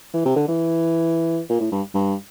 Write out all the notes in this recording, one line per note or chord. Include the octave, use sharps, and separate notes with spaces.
E3
C3
D3
E3
A#2
A2
G2
G2